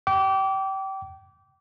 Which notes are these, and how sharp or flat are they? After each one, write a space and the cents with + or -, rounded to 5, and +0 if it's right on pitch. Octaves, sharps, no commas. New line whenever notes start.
G5 -25 D6 -25